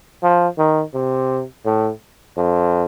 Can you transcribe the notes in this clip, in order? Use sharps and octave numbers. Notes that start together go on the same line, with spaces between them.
F3
D#3
C3
A2
F2